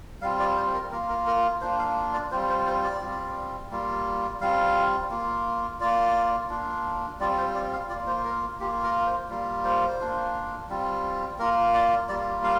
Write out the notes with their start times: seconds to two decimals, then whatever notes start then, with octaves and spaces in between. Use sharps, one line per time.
0.22 G3 C4 F4 F5
0.40 D5
0.57 C5
0.74 A#4
0.92 A#3 F4 A#4
1.09 A#4
1.27 A#4
1.61 A#3 D4 F4 C5
1.79 F5
2.14 D5
2.31 G3 C4 F4 C5
2.49 C5
2.66 C5
2.84 D5
3.01 G3 C4 F4
3.71 G3 A#3 F4
4.40 G3 C4 F4 F5
5.11 A#3 F4
5.80 A#3 F4 D5
6.50 A#3 D4 F4
7.20 G3 C4 F4 D5
7.38 C5
7.55 D5
7.73 F5
7.90 A#3 F4 D5
8.07 C5
8.25 A#4
8.60 A#3 F4 G4
8.83 A#4
9.06 C5
9.29 G3 A#3 F4
9.65 C5
9.99 A#3 D4 F4
10.69 G3 C4 F4
11.39 A#3 F4 A#4
11.74 D5
12.09 G3 A#3 F4 D5
12.44 F5